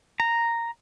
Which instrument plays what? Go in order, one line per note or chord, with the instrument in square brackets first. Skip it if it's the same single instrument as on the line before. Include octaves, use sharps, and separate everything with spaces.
[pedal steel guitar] A#5